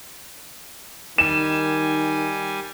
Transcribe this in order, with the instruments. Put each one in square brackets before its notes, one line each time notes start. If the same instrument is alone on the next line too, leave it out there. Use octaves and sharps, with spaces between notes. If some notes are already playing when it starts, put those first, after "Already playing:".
[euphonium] D#3 [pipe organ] G3 G#5 [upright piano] E7